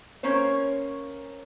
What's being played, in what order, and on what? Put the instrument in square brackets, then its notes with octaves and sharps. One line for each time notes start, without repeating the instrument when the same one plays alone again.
[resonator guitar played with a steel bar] A#3 C#4 A#4 C5 C#5